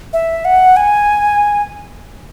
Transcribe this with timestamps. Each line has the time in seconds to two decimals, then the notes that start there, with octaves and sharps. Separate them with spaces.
0.13 E5
0.45 F#5
0.77 G#5